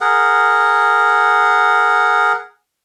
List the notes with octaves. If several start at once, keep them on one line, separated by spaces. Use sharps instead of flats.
G#4 A#4 F#5